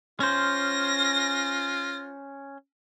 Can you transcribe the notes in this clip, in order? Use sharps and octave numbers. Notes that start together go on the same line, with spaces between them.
C#4 F4 C5 A#6